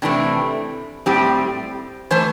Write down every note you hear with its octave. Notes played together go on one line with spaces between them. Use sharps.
C3 E3 A3 C4 D4
A2 G3 C4 G4
E3 A3 C5